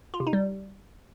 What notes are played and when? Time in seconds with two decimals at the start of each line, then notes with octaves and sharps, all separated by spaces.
0.14 F4
0.20 C3
0.27 D#4
0.33 G3